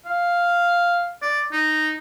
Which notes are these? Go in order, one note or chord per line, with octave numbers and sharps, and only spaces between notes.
F5
D5
D#4